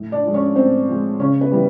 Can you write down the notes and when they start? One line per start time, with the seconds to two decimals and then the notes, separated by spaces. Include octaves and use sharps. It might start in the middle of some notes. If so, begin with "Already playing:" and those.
Already playing: A2
0.12 D4 D5
0.23 F3 G#3
0.34 C#4 C#5
0.55 A2 C4 C5
0.88 F3 G#3
1.19 C#3 C#4 C#5
1.41 B3 B4
1.51 E3 G3